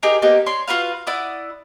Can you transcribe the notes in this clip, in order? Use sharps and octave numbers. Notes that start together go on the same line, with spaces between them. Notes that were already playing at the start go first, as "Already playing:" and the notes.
D#4 G4 G#4 A#4
A#3 B3 D#4 G4
C#5 D5 C6
F4 F#4 B4 F5
E4 D5 F#5 D#6